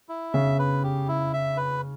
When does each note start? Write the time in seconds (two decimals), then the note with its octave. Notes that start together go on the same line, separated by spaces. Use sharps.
0.09 E4
0.33 C#3 E5
0.59 B4
0.84 G4
1.08 E4
1.33 E5
1.57 B4